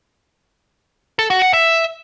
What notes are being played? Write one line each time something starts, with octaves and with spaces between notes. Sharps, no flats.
A4
F#4
F#5
E5